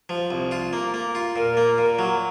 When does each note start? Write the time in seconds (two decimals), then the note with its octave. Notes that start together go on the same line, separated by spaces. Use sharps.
0.09 F3
0.31 C2
0.51 F4
0.73 A#3
0.94 A#3
1.15 F4
1.36 A#2 A#4
1.57 A#3
1.78 A#2
1.99 F#3